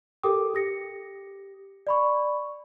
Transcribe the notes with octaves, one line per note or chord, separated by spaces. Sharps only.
G4 A4 A#4 G5 D6 D#6
G4 D#6 A#6 C#7
D5 B5 C#6